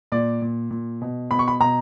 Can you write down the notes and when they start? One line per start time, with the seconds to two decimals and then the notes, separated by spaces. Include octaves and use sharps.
0.12 A#2 D5
0.42 A#2
0.71 A#2
1.01 B2
1.31 B2 B5
1.39 C#6
1.48 B5
1.60 B2 A#5